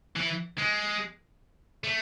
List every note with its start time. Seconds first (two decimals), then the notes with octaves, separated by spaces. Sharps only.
0.16 E3
0.58 G#3
1.84 A3